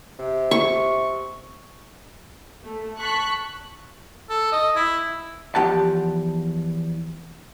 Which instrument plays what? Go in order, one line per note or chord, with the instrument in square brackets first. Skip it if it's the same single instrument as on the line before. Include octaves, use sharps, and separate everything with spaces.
[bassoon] C3
[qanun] C#6
[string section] A3
A5 C#6 F#6 B6
[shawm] A4
D#5
E4
[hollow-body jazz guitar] E2 F3 G4 F#5 A5